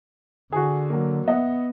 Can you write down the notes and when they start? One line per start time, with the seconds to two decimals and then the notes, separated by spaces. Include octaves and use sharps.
0.52 D3 F#4 G#4
0.90 F#3 A#3
1.28 B3 D#5 E5 F#5